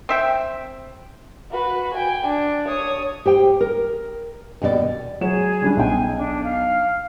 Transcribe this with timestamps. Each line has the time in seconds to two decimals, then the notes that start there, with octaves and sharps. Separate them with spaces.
0.09 C4 E5 G5
1.51 F#4 B4
1.94 G5 G#5
2.26 D4
2.68 C#5 D#6
3.26 G4 C5 G5
3.61 A#4
4.62 D#2 B2 F#4 D5
5.21 F#3 G#4 C#5 E7
5.62 G3 C#4 D4
5.77 B1 G5 G#5
6.18 D4
6.43 F5